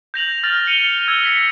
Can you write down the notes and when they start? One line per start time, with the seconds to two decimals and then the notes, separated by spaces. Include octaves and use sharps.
0.14 G6 A#6 F7 F#7
0.43 F6 A6 A#6 F7 F#7
0.67 C#7 D#7 F7 G7
1.08 E6 G#6
1.23 A#6 B6 C#7